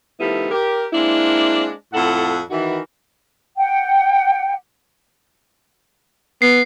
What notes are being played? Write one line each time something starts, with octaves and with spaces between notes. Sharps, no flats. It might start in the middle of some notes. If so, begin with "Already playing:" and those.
D#3 F3 G3 A3 B3 E4
G4 A#4
G#3 A#3 C4 D4 E4
F2 A2 A4 F#5
D#3 E3 F#4
F#5 G5
B3 C7